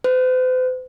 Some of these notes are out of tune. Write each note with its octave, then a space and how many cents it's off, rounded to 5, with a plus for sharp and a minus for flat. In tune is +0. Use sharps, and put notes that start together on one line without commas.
C5 -45